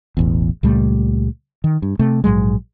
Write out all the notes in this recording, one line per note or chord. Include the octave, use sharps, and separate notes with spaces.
E1 A1 E2
C#2 A#2 G3 A3
D#3
G2
C3 A3
A#1 G#2 F#3 G#3